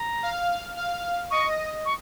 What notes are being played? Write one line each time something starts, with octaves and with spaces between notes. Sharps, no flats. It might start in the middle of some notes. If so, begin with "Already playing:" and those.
Already playing: A#5
F5
F5
D#5 C#6
C#6